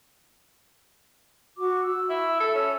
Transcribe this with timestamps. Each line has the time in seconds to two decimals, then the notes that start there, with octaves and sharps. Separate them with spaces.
1.58 F#4 C#6 D6
1.83 E6
2.09 E4
2.40 A4
2.54 C#4